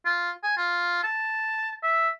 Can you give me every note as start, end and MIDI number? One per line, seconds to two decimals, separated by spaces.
0.06 0.31 65
0.44 0.53 80
0.57 1.03 65
1.03 1.76 81
1.84 2.09 76